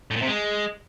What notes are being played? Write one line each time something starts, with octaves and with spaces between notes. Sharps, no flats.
A2
A#2
C3
G#3